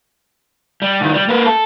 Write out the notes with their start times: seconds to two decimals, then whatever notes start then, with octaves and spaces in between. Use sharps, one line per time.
0.82 G3
1.01 C2 D#3
1.13 G3
1.29 A#3 B4
1.46 A4